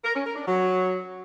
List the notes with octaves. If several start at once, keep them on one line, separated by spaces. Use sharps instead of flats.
A#4
C#4
A#4
D4
F#3